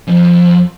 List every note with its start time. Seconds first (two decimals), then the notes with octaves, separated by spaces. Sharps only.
0.08 F2